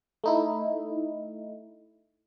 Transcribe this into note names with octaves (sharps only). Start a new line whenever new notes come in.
A3 D#4 E4